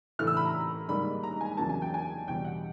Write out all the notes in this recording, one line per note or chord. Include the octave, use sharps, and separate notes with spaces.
A2 E3 A3 F6
E6
B5
A#5
G#2 D#3 G3 A#3 B5
A#5
G#5
E2 C#3 F#3 A#3 A5
G#5
G5
G#5
E2 B2 G3 G5
F#5